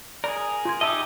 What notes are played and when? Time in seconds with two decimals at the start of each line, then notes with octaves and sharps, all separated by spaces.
0.24 G#4 A#4 D5
0.65 F4 C6 G#6
0.81 D#4 G4 D#5 E5 A5 E6